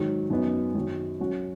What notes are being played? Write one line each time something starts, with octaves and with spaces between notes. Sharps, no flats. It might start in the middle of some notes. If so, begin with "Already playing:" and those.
Already playing: G#2 D#3 F#3
F#2 F#3 B3 D#4
F#2 D#3 F#3
F#2 F#3 C#4 F#4